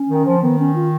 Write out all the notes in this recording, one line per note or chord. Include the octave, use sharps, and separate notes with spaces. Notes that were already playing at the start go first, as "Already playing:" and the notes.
Already playing: C#4
D#3
F3
D#3 B3
C#4
F4